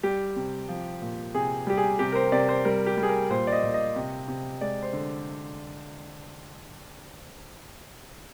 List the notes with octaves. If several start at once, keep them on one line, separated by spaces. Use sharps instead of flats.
G3 G4
C3
F3
A#2
C3 G#4
G3 G4
G#4
C3 G4
A#4
C5
C3 D5
C5
G3 A#4
G4
G3
G#4
A#4
A#2 C5
D5
D#5
A#2
D#5
C3
C3
G#3 D5
C5
D3